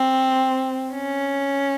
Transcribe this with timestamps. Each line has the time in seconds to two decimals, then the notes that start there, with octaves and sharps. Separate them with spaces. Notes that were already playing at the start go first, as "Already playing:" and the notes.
Already playing: C4
0.93 C#4